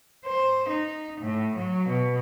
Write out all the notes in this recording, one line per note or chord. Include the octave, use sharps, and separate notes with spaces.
C5
D#4
A2
F#3
B2